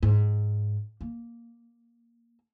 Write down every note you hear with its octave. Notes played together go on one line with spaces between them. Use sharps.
G#2
A#3